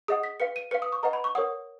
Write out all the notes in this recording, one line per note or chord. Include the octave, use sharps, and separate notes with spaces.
G#4 D#5 F#5 D#6
B6
B4 F5 C#7
D#7
B4 F5 C#7
D#6
C#6
B4 D#5 F#5 A#5
B5
C#6
A#4 C#5 F#5 D#6